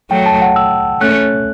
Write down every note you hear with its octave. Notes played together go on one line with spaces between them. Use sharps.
F#3 A3 G5
A5
F#5
E6
A3 C#4 F#6